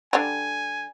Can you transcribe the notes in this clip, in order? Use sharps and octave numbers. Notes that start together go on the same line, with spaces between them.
D3 G3 G#5